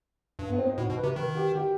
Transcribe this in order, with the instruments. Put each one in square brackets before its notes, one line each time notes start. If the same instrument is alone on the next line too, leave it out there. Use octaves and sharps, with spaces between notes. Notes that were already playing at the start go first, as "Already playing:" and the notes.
[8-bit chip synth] G2
[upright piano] B3
C4
D#4
[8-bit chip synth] A2 [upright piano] F#4
[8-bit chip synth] B2
[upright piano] B4
[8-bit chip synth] C3
[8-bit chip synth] D#3 [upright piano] B4
[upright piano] G4
G4